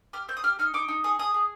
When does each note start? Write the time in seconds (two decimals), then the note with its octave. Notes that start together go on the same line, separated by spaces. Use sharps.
0.13 G4 F6
0.28 C4 G6
0.37 D#6
0.44 G4 F6
0.59 D#4 F6
0.74 D#4 D6
0.88 D#4
1.04 G#4 D#6
1.19 G#4 D#6
1.34 G#4